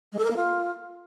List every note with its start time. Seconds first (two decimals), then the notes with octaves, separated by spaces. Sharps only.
0.12 G#3
0.18 A4
0.24 A#4
0.30 A#3
0.36 F4